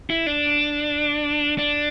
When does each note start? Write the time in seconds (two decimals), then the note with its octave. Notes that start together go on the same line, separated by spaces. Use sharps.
0.10 E4
0.27 D4
1.58 D4